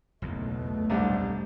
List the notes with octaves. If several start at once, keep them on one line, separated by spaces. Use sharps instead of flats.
F#1 B1 E2 B2 A3
C2 G3 D4